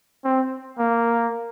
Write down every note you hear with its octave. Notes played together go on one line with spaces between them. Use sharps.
C4
A#3